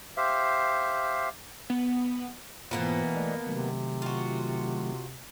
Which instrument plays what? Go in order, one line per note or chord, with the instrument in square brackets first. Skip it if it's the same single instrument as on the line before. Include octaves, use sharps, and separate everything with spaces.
[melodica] G4 C5 E5 F5
[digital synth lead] B3
[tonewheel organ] G#2 F4 C5 [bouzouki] B2 A#3 B3 [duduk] E3
[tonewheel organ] A3 D5 D#5
[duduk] C3 [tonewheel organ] D#3 F#3 A3
[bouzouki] F4 F#4